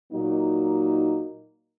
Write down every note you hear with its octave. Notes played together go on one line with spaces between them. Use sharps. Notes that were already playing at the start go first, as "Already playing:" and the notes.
A#2 F#3 A#3 D#4